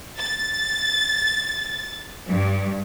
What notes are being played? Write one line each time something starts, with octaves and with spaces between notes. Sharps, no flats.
A6
G2